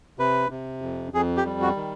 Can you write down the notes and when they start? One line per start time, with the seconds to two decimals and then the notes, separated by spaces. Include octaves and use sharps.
0.19 C3 B4
0.50 C3
0.82 F2
1.13 F2 G#4
1.37 G4
1.46 G3
1.62 F#4
1.76 D#3